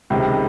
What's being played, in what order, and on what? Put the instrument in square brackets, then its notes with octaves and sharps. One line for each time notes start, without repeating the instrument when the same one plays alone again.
[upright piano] C#2 C3 D#3